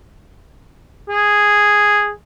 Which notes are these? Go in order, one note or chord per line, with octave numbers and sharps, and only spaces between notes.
G#4